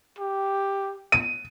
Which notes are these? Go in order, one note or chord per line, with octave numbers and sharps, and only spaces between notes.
G4
D#7